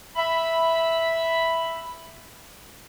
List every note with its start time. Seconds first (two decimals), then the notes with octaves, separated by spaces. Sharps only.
0.16 E5 B5